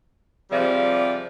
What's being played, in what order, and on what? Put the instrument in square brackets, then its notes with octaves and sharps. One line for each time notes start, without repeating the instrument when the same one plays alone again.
[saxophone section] C3 F3 G3 G#4 D5